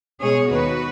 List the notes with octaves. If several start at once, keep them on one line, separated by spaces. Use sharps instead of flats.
B2 G#3 C#4 G#4 C#5
D#2 D#3 B3 F#4 B4